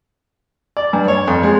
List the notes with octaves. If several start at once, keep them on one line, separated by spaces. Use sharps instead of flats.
D5
G2
C#5
F2
G#3